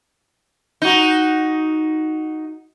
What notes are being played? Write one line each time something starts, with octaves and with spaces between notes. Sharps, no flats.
D#4 F#4